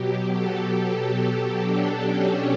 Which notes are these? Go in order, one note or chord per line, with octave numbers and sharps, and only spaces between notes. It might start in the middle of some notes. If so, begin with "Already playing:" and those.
Already playing: B2 F#3 G4
A4
A4
D4
C#4